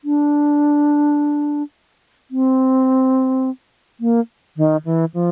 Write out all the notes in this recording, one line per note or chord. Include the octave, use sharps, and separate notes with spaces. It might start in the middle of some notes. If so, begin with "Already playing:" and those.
D4
C4
A#3
D#3
E3
F3